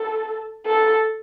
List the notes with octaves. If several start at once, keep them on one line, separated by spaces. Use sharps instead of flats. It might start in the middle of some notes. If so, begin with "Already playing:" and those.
Already playing: A4
A4